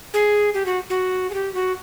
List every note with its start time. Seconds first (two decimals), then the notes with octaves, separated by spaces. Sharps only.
0.14 G#4
0.54 G4
0.66 F#4
0.90 F#4
1.30 G#4
1.34 G4
1.54 F#4